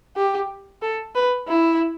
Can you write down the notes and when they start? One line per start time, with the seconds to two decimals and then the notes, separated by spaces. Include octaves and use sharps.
0.16 G4
0.82 A4
1.15 B4
1.47 E4